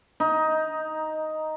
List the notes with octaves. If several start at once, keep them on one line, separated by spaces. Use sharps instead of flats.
D#4